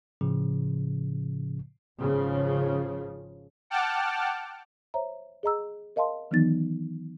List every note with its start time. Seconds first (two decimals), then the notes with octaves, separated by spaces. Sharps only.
0.21 A2 C#3 F3
1.99 G#1 C#3 F3
3.70 F#5 G5 A5 D6 F6
4.94 C5 C#5 E5 A#5
5.43 G#4 D#5 A#5 E6
5.96 A#4 D#5 F5 A5 C6
6.31 D#3 E3 F#3 B3 D#4 A6